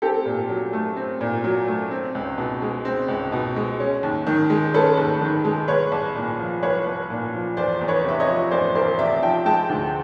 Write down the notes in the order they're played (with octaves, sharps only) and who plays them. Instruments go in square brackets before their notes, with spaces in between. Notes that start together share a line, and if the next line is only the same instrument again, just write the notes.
[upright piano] C4 G4 A4
A#2
F#3
A3
C4
A#2
F#3
A3
C4
C#2
B2
G#3
C4
C#2
B2
G#3
C#4
D#2
D#3
G#3
C#4 A4 B4
D#2
D#3
G#3
C2 B4 C#5
C2
A#2
F3
C2 B4 C#5
C2
A#2
F3
E2 C5 D5
E2
B4 C#5
C3 E5
C#5 D#5
F3
E2 C5 D5
E2 A#4 C5
C3 D5 E5
F3 G5 A5
G#3 G5 A5
D2